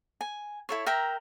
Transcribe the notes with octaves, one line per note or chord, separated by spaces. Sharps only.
G#5
E4 A4 C#5
A#4 E5 G5 A#5